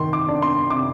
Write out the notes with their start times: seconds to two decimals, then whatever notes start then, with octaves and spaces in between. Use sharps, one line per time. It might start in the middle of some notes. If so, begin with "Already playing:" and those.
Already playing: D#3 C6
0.13 D6
0.28 D4
0.42 C6
0.70 C3 D6